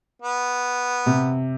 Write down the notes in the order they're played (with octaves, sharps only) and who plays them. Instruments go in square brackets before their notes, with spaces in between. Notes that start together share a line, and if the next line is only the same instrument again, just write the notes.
[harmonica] B3
[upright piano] C3